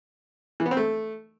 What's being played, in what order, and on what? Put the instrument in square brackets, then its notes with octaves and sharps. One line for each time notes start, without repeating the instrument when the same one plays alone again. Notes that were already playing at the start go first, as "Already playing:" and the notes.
[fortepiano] E3
B3
C4
A3